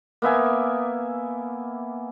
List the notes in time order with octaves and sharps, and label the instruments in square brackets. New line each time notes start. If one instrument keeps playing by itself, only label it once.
[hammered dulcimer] A#3 B3 E5 G#5